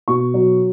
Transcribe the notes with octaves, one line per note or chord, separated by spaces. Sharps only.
B2 C#6
F#3